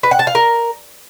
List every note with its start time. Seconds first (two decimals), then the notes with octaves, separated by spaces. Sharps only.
0.03 B4
0.11 F#5
0.19 A5
0.27 F5
0.35 A#4